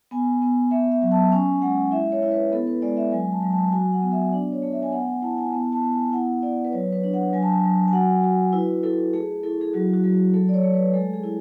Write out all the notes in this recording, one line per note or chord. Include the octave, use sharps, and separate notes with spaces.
B3 G#5
B3
A3 E5
E5
F#3
A5
C#4 G#5
G#3 F#5
E4 E5
C#5
E4
B4
B3 A4
B4
G#3 D5
E5
F#3 G#5
A5
F#3
A5
F#4 G#5
F#5
B3
E5
D4 D5
C#5
A3
E5
G#5
B3 F#5
G#5
E4 A5
G#5
B3 A5
A5
B3
G#5
E4 F#5
E4 D5
B4
F#3 C#5
B4
D4
F#5
F#3 G#5
A5
G#5
F#3
G#5
F#4 F#5
F#4
E4 B4
E4 A4
A3 G#4
E4 A4
G#4
F#3 F#4
F#4
F#3
F#4
A3 A4
D5
C#5
A3
B4
G#3 A4
G#4
E4